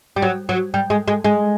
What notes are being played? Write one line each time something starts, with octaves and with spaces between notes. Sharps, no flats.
G3
F#3
F#3
G3
G#3
G#3
G#3